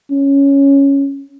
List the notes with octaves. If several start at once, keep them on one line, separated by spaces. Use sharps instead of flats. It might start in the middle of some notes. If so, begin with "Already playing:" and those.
C#4